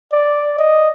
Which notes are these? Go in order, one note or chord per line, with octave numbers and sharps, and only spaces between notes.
D5
D#5